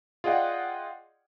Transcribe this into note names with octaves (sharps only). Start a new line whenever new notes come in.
F4 G#4 D5 D#5 F#5 G5